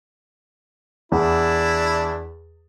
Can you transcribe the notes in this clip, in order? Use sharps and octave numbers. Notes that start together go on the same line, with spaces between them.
E2 D4 E4